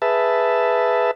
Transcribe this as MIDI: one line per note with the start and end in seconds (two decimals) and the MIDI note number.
0.02 1.11 68
0.02 1.11 71
0.02 1.11 76
0.02 1.11 81